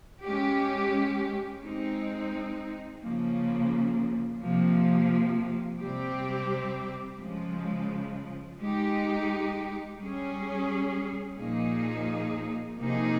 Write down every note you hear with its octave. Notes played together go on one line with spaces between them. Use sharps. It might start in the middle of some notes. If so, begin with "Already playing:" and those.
G#3 C#4 G4
G#3 C4 D#4
C#3 F3 A#3
C3 F3 A#3
C3 G3 C4 G4
C#3 F3 G#3
G#3 D#4 G4
G3 C#4 G#4
A#2 F3 A#3 D#4 G#4
C3 F3 A#3 D#4 G#4